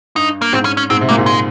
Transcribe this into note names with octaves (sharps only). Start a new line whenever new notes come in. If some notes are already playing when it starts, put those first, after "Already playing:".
G2 D#4
A#3
G#2 C4
C#4
C#4
G#2 C4
C3
A#2 A#3
G#2
G#3